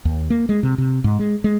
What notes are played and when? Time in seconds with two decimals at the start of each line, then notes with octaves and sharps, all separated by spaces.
0.05 D#2
0.30 A#3
0.49 G#3
0.63 C3
0.78 C3
1.04 G#2
1.19 G#3
1.44 G#3